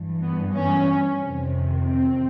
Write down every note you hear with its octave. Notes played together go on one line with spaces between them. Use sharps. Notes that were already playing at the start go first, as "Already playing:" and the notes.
Already playing: G2 E3
B3
C#4
F2 C3 D#3
C4